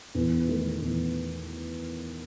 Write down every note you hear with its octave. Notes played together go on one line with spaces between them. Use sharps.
E2
D#3 A3 D#4
E2